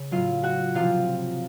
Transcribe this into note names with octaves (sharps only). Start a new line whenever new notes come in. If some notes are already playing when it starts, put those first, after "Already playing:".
Already playing: C#3
A2 F#3 F4 F5
F#4 F#5
C3 F3 F4 F5